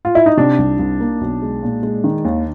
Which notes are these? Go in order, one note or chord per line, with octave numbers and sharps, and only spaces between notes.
F4
E4
D#4
C3 D4
C2
C2
A#3
B1
G#3
A#2
G#3
D#3
D#2